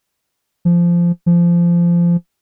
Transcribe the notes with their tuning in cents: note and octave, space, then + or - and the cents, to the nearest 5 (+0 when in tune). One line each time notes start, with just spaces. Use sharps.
F3 -15
F3 -20